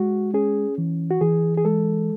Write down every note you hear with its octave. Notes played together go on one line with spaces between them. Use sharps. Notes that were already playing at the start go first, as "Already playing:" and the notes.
Already playing: G#3 F#4
C#4 G#4
E3
F#4
E3 G#4
G#4
G#3 A4